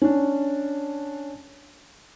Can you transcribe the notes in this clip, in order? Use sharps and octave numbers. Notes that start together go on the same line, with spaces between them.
C#4 D4